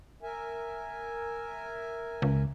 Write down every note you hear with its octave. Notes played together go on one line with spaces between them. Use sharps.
A#4 E5 G#5
C#2